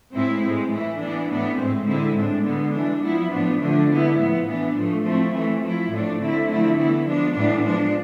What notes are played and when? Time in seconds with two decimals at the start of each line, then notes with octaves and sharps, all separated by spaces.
0.14 A2 G#3 C4 E4
0.43 A2 G#3 C4
0.71 E3 A3 E4
1.00 E3 B3 D4
1.30 A2 E3 B3 D4
1.58 A2 G#3 C4
1.87 D3 G#3 C4 E4
2.15 A2 G#3 D4
2.45 D3 G#3 B3
2.74 E3 G#3 D4
3.02 F3 B3 E4
3.31 A2 F3 B3 D4
3.59 D3 F3 A3 D4
3.89 D3 G#3 B3 E4
4.17 A2 F3 B3
4.46 E3 B3 D4
4.75 A2 F3 A3
5.04 F3 A3 C4 E4
5.34 E3 A3 C4
5.62 F3 A3 E4
5.91 A2 F3 A3 D4
6.19 D3 A3 C4 E4
6.48 D3 F3 A3 C4 E4
6.77 E3 B3 E4
7.05 F3 G#3 B3 D4
7.34 A2 E3 B3 D4
7.64 F3 G#3 D4